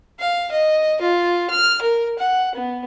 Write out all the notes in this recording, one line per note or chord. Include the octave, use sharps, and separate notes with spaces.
F5
D#5
F4
F6
A#4
F#5
B3